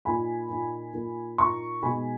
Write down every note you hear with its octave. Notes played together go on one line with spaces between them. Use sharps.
A#2 A#3 D#4 G#5 B5
A#2 A#3 D#4
A#2 A#3 D#4
A#2 A#3 D#4 A#5 C#6
B2 G#3 B3 D#4 G#5 B5